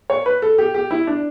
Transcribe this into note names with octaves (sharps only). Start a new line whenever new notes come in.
C#5
B4
A4
G4
G4
E4
D4